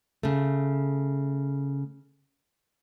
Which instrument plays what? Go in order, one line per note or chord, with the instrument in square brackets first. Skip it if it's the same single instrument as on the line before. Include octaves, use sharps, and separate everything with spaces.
[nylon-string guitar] C#3 A3